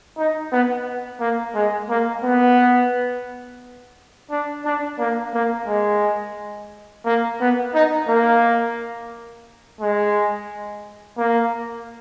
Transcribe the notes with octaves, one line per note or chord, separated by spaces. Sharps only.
D#4
B3
A#3
G#3
A#3
B3
D4
D4
A#3
A#3
G#3
A#3
B3
D#4
A#3
G#3
A#3